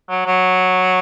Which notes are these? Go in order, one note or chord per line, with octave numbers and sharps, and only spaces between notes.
F#3
F#3